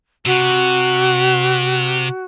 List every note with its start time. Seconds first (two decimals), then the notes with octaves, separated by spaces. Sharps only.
0.26 C3 F#4